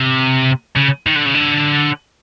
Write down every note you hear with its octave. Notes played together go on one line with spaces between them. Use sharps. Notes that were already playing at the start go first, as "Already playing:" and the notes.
Already playing: C3
C#3
D#3
D3
C#3
D3